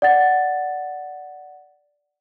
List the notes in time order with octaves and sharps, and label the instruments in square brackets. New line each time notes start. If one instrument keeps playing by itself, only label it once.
[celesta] D5 F#5 A6